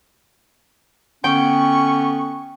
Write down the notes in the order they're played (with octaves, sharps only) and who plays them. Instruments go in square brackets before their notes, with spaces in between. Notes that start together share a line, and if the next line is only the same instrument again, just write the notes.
[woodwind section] D3 B3 C#4 [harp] G5 [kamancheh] C#6